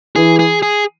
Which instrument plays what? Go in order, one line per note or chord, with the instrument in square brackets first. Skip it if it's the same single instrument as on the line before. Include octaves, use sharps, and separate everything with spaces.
[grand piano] E3 [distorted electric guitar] G#4
[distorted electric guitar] G#4
G#4